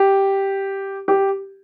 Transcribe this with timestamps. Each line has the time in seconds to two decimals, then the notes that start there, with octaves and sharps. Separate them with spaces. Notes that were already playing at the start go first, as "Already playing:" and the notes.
Already playing: G4
1.08 G4